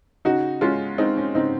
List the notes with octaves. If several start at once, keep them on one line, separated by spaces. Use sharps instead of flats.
C#3 D#4 F#4
G#3 C#4 F4
G#3 C4 D#4
C#4
C#3 C4 D#4